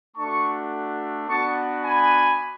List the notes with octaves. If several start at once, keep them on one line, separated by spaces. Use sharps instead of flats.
A3 D4 F#4 A5 C#6
B3 D4 F#4 A5 C#6
G#5 B5